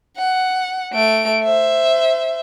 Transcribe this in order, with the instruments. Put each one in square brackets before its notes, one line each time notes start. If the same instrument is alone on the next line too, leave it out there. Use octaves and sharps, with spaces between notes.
[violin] F#5
A3 D7
C5 E5